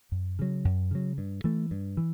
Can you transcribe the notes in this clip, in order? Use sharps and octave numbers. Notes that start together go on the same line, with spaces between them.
F#2
C#3 F#3
F#2
C#3 F#3
G2
E3 A3
G2
E3